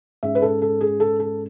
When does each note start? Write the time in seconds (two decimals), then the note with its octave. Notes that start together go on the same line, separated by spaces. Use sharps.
0.23 G#2 G#3 C#4 E5
0.35 B4
0.42 A4
0.62 A4
0.81 G#4
1.00 A4
1.20 A4